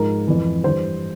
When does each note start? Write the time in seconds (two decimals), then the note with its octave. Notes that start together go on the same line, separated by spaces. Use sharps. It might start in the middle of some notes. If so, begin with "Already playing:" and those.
Already playing: G#2 F3 A#4
0.28 F2 E3
0.63 G2 E3 C5